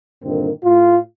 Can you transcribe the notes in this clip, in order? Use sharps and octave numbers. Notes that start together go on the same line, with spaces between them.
G2 A#2 D3 D#3 A#3 C4
A2 F4